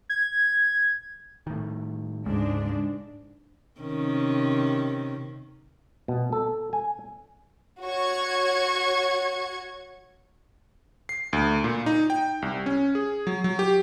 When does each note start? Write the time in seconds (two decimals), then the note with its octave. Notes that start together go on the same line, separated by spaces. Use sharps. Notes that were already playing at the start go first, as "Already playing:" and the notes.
0.09 G#6
1.47 A2 D#3
2.26 D2 G#2 C#3 G#3 D4
3.81 C3 D#3 C#4
6.08 B2
6.32 A4
6.73 G#5
7.82 F#4 C#5 C#6 G#6
11.09 C7
11.33 D2
11.64 A#2
11.86 D#4
12.10 G5
12.42 C2
12.66 C#4
12.95 G#4
13.27 F#3
13.44 F#3
13.59 G4